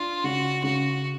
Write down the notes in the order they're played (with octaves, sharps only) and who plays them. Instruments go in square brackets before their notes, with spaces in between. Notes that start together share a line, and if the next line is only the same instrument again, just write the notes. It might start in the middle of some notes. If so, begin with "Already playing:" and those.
Already playing: [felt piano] D4 [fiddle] F4
[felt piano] C#3 [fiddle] F#4
[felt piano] C#3 [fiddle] F#4